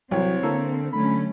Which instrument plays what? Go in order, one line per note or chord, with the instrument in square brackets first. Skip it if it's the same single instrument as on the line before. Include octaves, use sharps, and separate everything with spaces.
[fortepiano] C2 E3 [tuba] F#3 [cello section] C4 [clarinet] C#5
[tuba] D3 [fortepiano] A#3 E4 A4
[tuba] D3 [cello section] F#3 A3 C#4 [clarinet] B5